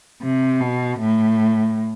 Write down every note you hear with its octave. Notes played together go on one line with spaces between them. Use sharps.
C3
B2
A2